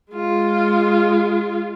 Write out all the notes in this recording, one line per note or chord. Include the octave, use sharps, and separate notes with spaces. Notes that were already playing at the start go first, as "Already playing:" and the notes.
G#3 F4